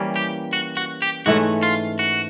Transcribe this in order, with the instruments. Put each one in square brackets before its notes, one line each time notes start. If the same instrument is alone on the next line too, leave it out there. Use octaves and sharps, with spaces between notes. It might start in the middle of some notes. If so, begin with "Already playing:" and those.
Already playing: [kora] E3 G3 A#3 C#4
[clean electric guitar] G4
F#4
F#4
G4
[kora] G#2 E3 A3 C#4 [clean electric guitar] F#4
[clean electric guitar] F4
F#4